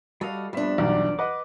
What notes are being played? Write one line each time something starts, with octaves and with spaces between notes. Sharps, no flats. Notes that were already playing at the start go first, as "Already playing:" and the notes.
G3 F#4 A4 D#5 F5
F2 G3 B3 D4 E5
B1 E2 G2 D5
B4 D#5 F#5 D6